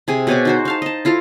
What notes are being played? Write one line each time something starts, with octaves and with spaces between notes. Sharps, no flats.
C3 G#4 G#5
B2 C#5 G#5 D6
D#4 F#4 C5
D#4 F5 A5
D#5 A5
E4 F4 A4 A#5